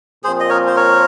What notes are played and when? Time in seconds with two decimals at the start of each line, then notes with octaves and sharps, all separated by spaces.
0.24 A#2 F3 C4 G#4 C5
0.40 D#5
0.49 A#4 C#5
0.67 C5
0.76 A#4 C#5